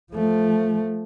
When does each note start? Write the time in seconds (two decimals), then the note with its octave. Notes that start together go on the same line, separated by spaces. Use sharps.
0.13 F3 A3